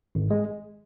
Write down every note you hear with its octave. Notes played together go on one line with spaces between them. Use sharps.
G#1
G#3